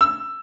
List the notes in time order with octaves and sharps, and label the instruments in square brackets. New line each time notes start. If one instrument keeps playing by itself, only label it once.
[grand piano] E6